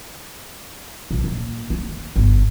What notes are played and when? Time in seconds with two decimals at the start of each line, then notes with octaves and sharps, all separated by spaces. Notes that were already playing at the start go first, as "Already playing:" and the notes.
1.11 A#1
1.24 A#2
1.70 A#3
1.89 D#3
2.16 G1